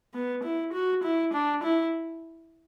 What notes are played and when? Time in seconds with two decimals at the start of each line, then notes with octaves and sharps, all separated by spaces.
0.14 B3
0.43 E4
0.73 F#4
1.04 E4
1.33 D4
1.63 E4